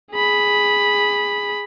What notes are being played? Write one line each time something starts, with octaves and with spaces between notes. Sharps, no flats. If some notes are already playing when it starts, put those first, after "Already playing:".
G#4 B5